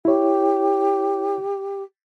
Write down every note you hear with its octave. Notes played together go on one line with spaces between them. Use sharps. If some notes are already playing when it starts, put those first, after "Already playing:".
E4 G4 C#5